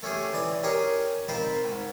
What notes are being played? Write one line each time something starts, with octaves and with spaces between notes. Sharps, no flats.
A3 C#4 G4 G#4
E3 D5 D#6
C#4 G4 G#4 A#4 C#5 D#5
C4 D#4 F4 A#4 C5 B5
G#2